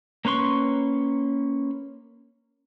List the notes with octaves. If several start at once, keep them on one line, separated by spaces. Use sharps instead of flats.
A#3 C#4 B4 C6 C#6